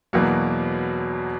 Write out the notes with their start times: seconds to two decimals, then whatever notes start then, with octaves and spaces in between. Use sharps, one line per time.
0.13 E2 B2 F#3 A#3